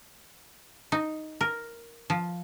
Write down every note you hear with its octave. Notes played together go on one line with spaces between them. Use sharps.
D#4
A#4
F3